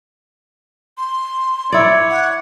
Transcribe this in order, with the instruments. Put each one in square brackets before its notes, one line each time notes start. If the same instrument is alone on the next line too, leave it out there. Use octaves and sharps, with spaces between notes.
[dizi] C6
[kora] E4 D5 [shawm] C#5
[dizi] F#5